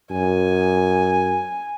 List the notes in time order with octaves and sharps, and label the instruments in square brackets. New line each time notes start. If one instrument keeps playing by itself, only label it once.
[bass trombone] F#2 [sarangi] G#5